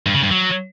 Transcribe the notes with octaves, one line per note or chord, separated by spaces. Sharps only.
G2
C#3
G2
F#3